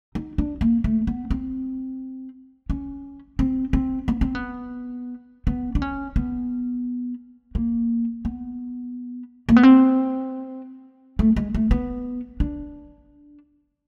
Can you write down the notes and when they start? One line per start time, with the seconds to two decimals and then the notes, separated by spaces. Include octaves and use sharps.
0.15 D#4
0.38 D4
0.61 A#3
0.84 A3
1.07 B3
1.30 C4
2.70 C#4
3.39 C4
3.73 C4
4.08 B3
4.21 C4
4.35 B3
5.47 B3
5.75 D4
5.82 C#4
6.16 B3
7.55 A#3
8.25 B3
9.49 A#3
9.57 B3
9.63 C4
11.19 A3
11.36 G#3
11.54 A3
11.71 B3
12.40 D4